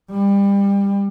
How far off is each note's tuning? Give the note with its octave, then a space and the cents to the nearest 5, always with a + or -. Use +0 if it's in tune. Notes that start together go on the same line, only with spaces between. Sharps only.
G3 +25